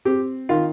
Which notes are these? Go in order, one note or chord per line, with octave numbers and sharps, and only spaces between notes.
C4 G4
D#3 F4